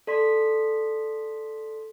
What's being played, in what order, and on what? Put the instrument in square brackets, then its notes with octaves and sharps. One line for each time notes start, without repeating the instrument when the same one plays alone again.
[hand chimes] A4 D5 C6 B6